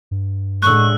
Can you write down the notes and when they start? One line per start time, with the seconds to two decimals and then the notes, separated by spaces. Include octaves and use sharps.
0.11 G2
0.63 A2 D3 G#3 C#6 E6 F#6